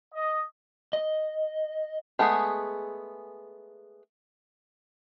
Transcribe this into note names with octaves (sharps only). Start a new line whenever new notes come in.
D#5
D#5
G#3 A3 B3 D4 G#4